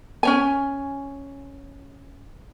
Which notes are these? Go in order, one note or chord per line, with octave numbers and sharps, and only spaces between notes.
C#4 C#5 G#5